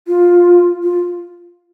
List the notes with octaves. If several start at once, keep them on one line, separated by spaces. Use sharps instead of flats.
F4
F4